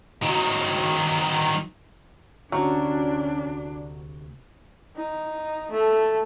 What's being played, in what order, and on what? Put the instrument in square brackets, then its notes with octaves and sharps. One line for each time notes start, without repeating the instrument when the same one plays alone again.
[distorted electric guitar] D#3 F#3
[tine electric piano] D2 C3 C#6 [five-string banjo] F#3 [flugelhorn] C#4 [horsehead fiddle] D4
[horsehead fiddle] D#4
A3 A4